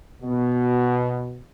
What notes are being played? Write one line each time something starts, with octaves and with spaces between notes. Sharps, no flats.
B2